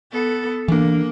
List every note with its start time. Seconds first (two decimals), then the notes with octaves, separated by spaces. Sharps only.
0.12 B3 A4
0.68 E3 A#3 D4